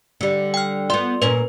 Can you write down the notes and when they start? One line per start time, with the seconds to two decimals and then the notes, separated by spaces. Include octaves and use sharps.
0.21 D3 G3
0.54 G5 F6
0.90 B3 F4 D5 C6
1.22 A#2 C#4 A#4 B4